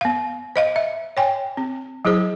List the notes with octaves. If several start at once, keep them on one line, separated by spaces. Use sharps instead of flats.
B3 F5
C5 D#5 F5
E5
C#5 G5 G#5
C4
F#3 E4 G#4 C5